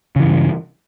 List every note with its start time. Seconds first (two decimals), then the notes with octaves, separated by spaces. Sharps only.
0.16 C#3
0.20 E3
0.23 G2